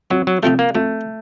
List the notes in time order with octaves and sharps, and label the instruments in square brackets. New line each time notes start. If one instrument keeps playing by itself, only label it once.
[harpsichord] F2 [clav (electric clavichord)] F#3
[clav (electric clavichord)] F#3
[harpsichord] C3 F3 C4 D#4 [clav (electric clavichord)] A3
[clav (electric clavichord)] A#3
[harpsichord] F2 [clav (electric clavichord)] A3